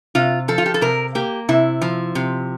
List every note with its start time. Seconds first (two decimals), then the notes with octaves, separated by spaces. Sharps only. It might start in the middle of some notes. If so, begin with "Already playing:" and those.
0.15 C3 F4
0.48 F3 A4
0.58 F4
0.66 G4
0.74 A4
0.81 C3 A#4
1.15 A#3 G4
1.49 C3 E4
1.81 F3
2.15 C3